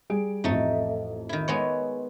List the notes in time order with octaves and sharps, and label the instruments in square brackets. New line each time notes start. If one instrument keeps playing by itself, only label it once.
[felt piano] G3 G#4 D7
[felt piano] A1 F2 [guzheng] A3 D#4
[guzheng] D#3 E4
G#3 B3 C#5